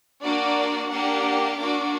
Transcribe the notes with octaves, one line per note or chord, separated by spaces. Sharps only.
A#3 D4 F#4 D5
A#3 D4 G4 F#5
A#3 D4 F#4 D6